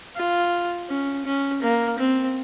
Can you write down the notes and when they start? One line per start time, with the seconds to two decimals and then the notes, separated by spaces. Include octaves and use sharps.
0.16 F4
0.89 C#4
1.25 C#4
1.62 A#3
1.99 C4